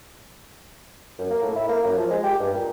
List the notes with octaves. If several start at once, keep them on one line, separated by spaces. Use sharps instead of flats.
F#2
A#3
A2
E4
A#3
F#2
F3
G#3
G4
G2
A#2